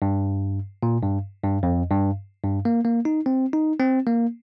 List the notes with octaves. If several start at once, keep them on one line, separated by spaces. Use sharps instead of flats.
G2
A#2
G2
G2
F2
G2
G2
A#3
A#3
D#4
C4
D#4
C4
A#3